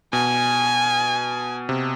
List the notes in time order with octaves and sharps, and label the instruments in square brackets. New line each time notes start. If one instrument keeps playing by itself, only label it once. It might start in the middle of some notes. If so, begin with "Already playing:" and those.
[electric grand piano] B2 [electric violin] G#5
[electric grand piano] C3